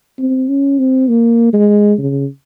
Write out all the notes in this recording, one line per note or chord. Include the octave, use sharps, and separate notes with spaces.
C4
C#4
C4
A#3
G#3
C#3